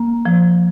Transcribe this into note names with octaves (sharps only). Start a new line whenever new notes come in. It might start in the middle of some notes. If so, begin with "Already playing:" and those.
Already playing: A#3
F3